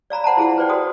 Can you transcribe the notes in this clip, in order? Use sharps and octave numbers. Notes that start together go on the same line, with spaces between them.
D5 F5 A#5 B5
C5 F#5 A5 A#5
E4 F4 G#4 F5 F#5
B4 C5 D5 G5
F#4 G#4 D#6